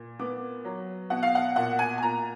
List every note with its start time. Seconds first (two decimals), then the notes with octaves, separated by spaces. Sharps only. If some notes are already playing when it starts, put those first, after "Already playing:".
Already playing: A#2
0.19 B3 D6
0.65 F#3
1.10 B2 F#5
1.23 F5
1.35 F#5
1.56 A#2 F#5
1.79 G#5
1.98 G#5
2.02 A#2 A#5